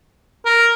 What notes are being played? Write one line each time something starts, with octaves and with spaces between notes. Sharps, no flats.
A#4